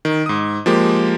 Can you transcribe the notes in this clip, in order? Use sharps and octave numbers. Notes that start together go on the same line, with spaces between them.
D#3
G#2 D#6
F3 G#3 A#3 G4